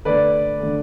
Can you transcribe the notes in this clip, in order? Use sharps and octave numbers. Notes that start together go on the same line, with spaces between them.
D3 A3 B4 D5
D3 A3